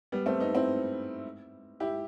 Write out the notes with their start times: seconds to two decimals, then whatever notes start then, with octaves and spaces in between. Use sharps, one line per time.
0.12 G3 B3
0.26 A3 C4
0.40 B3 D#4
0.54 C4 E4
1.80 E4 G4